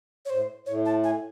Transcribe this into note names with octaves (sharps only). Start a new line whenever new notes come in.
C#5
A2 C5
A2 C#5
A5
G#5